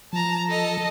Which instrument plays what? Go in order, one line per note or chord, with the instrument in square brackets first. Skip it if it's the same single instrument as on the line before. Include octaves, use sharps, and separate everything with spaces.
[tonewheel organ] F3 [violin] A5 A#5
[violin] A4 D#5